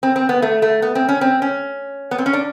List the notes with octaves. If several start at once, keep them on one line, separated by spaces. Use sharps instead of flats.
C4
C4
B3
A3
A3
B3
C4
C#4
C4
C#4
B3
C4
C#4
D4